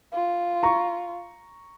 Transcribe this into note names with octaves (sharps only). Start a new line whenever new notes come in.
F4
A#5 C#6